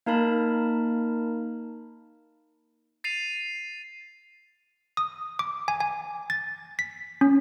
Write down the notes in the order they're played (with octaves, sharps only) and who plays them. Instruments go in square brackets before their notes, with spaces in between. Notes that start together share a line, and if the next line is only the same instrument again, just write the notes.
[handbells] A#3 D#4 A#4 A5 B5
[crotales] A6 C7 D#7 F7
[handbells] D#6
D6
G#5
G#5
A6
B6
C#4